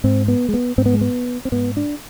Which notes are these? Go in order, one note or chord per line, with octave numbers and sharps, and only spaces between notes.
G#2 C4
B3
G#3
B3
G#2 C4
B3
G#3
B3
C4
G#2 B3
D4